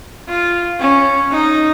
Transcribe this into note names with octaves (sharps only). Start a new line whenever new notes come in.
F4
C#4
D#4